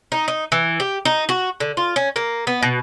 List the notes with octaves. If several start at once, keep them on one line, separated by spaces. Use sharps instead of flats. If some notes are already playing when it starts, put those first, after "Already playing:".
D#4
D#4
E3
G4
D#4
F#4
D3
F4
C#4
A#3
B3
B2